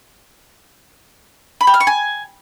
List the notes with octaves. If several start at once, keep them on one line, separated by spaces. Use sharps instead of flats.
B5
G5
F6
C#6
G#5